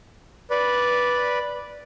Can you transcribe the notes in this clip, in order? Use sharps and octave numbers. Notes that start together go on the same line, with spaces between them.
B4 D5